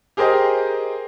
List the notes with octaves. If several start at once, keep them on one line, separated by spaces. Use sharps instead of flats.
G4 G#4 A#4 C5 D#5 G5